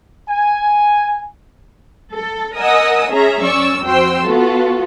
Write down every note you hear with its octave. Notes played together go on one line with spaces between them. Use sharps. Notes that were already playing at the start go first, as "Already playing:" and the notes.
G#5
A4
A#4 D#5 F#5 G#5 D#6 E6
C#4 G#4 E5 A#5
F#2 C#4 D5 C#6 E6
F2 F#4 C5 G5 C6 E6
B3 F4 F#4 A4